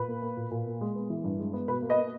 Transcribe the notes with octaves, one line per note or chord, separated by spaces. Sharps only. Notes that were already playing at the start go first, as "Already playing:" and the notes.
Already playing: A#2 B4
A#3
A#3
A#2
A#2
A#3
G#3
B3
E3
G2
G#3
B3
B2 B4
A#3
B4 D#5
A#3